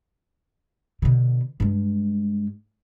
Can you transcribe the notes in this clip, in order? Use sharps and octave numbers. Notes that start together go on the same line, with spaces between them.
B2 D3
G2 G#3